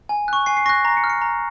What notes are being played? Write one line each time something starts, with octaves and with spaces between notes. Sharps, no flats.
G#5
C#6 F#6
G#5 C7
C7
C#6 F#6 A#6
A#5 A#6
C#7
F6
C#7
A#5